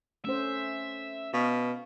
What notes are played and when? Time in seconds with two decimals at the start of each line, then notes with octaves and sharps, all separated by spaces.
0.24 A3 C#4 C5 E5
1.34 B2 F5